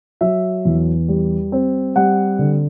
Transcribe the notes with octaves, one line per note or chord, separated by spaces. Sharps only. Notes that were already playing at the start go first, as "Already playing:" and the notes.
F#3 E5
E2
G3
C4
G3 F#5
D3